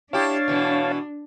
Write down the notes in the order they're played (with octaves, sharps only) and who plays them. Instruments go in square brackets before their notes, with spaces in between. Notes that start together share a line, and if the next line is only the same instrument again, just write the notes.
[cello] D4 [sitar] E4 G4 [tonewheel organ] C#5 F5 A5
[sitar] B2 E3